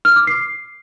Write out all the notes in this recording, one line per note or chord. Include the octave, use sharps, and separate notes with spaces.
F6
D6
C7